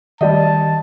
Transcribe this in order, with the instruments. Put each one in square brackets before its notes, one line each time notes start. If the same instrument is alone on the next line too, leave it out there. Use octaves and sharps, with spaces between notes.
[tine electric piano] D#3 [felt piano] G3 G4 D#5 [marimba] D5 [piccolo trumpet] A5